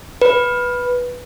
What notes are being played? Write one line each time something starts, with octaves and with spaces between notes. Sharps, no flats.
B4